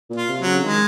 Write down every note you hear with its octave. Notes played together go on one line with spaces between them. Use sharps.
A#2
F4
C3
F#3
C#3
D#3 G#3